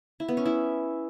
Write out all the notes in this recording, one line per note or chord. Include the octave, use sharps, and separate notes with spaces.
E4
B3
C#4
E4